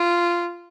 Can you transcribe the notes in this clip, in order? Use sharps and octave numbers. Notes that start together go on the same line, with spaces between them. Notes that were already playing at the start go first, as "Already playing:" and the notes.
Already playing: F4